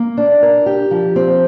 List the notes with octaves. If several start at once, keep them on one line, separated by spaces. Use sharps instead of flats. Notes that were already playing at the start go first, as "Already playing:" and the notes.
Already playing: A#3
D4
A#4
G4
F3
C4